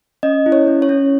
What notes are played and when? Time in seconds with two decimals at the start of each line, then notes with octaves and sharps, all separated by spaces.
0.23 C#4 D#5
0.46 E4
0.52 C#5
0.67 C#4
0.82 C#5
0.89 C#4